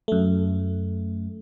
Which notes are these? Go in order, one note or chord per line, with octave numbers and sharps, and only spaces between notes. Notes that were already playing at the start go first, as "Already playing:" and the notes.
F#2 A3